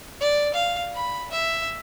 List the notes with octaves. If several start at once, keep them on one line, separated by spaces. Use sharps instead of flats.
D5
F5
B5
E5